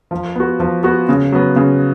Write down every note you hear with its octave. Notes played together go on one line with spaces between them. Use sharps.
F3
B3 F#4
F3
B3 F#4
C#3
F#3 B3
C#3